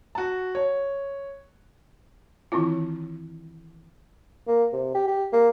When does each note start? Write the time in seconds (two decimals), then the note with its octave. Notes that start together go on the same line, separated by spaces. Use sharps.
0.15 F#4 A5
0.55 C#5
2.52 D#3 E3 C4 E4 F4
4.47 A#3
4.73 C3
4.95 G4
5.07 G4
5.33 A#3